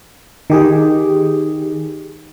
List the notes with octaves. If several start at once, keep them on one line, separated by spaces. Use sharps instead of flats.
D#3 G4 G#4